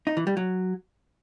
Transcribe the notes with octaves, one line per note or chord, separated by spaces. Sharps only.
D#4
E3
G3
F#3